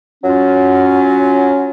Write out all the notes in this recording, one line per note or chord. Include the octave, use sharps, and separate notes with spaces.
F#3 C#4 F4